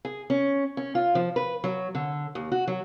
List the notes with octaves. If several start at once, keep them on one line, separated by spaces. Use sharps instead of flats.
G#4
C#4
C#4
F4
F3
B4
F#3
D3
D#2
F#4
F#3